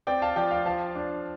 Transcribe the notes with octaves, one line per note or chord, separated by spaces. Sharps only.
C4 D5 G5
F5 A5
F3 D5 G5
F5
F3 F5 A5
D4